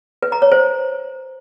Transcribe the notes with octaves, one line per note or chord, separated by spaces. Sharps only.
B4
A#5
C#5
C5